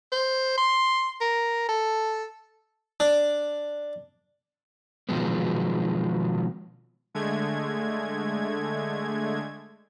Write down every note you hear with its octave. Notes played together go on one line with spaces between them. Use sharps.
C5
C6
A#4
A4
D4
B2 D#3 F3 F#3 G#3 B3
D3 G#3 A3 G#6